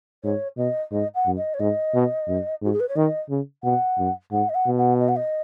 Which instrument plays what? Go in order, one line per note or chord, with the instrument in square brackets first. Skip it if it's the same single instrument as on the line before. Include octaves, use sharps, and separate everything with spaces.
[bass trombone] G#2 [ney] C#5
[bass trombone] B2 [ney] D#5
[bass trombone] G#2 [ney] D#5
[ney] F#5
[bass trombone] F#2
[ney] D#5
C#5
[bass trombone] G#2 [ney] D#5
[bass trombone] B2
F#2
[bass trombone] G#2 [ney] F#4
[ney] G#4
B4
C#5
[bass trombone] D#3 [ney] D#5
[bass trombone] C#3
[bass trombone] B2 [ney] F#5
[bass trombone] F#2
[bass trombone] G#2 [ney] F#5
[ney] D#5
F#5
[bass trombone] B2
[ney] F#5
D#5
F#5
D#5